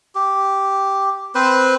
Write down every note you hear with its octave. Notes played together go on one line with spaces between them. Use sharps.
G4
C4 B4 C5